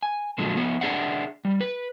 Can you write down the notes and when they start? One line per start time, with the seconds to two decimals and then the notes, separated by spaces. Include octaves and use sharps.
0.03 G#5
0.38 A#2 D3 F3 F#3 G#3
0.56 F3 B3 C#5
0.81 D4 G#4 D5 E5 F#5
1.45 G3
1.61 B4